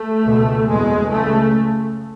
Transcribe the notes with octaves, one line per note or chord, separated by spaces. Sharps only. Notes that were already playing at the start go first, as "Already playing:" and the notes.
Already playing: A3
C#2 B2
F#1 E2 B2 G#3
C#2 C#3 A3